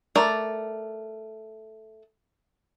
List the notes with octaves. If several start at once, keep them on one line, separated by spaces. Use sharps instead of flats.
A3 A#4 D5